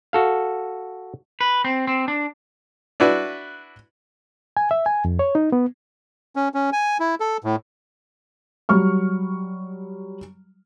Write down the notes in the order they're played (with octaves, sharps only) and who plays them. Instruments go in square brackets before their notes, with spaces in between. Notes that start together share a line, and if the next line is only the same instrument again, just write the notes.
[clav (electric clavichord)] F#4 A4 F5
[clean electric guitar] B4
C4
C4
D4
[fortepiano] D4 E4 F#4 B4
[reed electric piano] G#5
E5
G#5
F2
C#5
D#4
B3
[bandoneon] C#4
C#4
G#5
E4
A4
A2
[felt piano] F#3 G3 C#6 F6